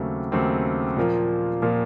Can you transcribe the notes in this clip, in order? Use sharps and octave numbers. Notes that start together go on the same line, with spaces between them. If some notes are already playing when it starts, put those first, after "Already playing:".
Already playing: D#2 C#3 F#3 A3 C4
D#2 C#3 F#3 A3 C4
A#2 F3 A#3
A#2 F3 A#3